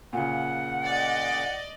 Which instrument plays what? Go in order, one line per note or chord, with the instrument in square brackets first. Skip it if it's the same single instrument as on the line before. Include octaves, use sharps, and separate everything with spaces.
[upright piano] A#2 C#3 [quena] F#5
[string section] D5 D#5